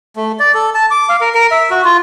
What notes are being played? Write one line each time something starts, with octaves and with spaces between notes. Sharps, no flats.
A3
D5
A4
A5
D6
F5
A#4
A#4
E5
F#4
F4